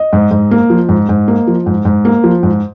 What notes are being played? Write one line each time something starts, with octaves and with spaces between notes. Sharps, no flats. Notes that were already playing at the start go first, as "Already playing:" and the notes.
Already playing: D#5
G#2
G#2
A#3
F3
G#2
G#2
A#3
F3
G#2
G#2
A#3
F3
G#2